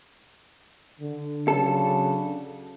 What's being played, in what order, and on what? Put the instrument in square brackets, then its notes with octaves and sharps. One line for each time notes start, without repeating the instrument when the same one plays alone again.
[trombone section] D3
[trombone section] C#3 F#3 D4 [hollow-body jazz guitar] A4